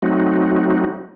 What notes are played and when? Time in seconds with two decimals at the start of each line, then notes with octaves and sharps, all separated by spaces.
0.02 F#3 A3 C4 D#4 F#4